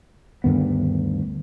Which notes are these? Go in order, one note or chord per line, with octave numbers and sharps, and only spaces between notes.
D2 G2 D#3 B3